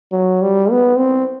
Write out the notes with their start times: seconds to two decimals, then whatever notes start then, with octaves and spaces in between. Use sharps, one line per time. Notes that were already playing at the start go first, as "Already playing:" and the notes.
0.12 F#3
0.42 G3
0.71 B3
0.98 C4